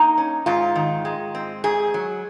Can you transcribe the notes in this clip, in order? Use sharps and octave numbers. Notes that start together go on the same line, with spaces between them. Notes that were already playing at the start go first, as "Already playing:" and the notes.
Already playing: A#3 D#4
C#4
G#2 F4
D#3
G#3
C4
G#2 G#4
F#3